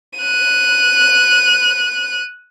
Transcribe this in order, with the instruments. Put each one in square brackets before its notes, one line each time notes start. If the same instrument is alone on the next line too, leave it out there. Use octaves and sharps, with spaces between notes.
[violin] F#6 D#7